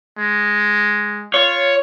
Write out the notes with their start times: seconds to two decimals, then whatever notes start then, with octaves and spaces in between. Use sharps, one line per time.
0.19 G#3
1.34 F4 C#5